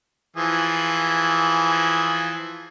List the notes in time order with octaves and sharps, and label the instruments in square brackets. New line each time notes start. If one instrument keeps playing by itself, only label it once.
[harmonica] E3 F3 G#4